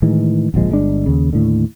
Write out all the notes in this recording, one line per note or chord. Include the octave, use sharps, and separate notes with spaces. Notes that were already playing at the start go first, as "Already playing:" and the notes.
A2 D#3 E3 G#3
D1 A#1 F3 G#3
G1 G#3 D4
D#2 C#3
D#2 A2 D3